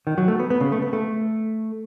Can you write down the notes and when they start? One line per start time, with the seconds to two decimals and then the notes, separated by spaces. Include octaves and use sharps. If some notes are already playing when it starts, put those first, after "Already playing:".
0.07 D#3
0.18 F#3
0.28 A3
0.39 B3
0.50 B3
0.61 C#3
0.72 A3
0.82 B3
0.93 A3